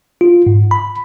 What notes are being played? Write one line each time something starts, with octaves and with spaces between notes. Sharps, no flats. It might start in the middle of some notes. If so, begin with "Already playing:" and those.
F4
G#2
B5